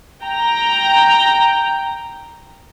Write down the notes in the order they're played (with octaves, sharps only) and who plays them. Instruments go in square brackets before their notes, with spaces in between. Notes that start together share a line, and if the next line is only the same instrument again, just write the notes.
[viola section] G5 A#5